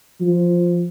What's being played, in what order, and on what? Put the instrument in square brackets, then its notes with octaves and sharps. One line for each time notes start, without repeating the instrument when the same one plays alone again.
[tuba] F3